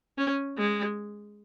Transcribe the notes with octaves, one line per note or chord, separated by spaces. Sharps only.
C#4
G#3